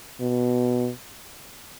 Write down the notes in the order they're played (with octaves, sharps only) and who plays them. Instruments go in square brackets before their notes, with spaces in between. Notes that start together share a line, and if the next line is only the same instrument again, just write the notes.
[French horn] B2